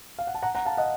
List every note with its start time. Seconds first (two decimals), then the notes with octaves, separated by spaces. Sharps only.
0.19 F5
0.27 F#5
0.35 A5
0.43 F#5 A#5
0.55 F#5 A#5
0.65 F5 A5
0.78 D#5 F#5